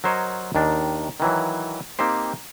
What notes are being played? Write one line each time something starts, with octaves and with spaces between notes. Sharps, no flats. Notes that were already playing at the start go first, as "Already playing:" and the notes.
F#3 A#4 C5 C#5 D#5
D#2 D#3 D4
D#3 E3 F#3
A#3 C4 D#4 G4 C5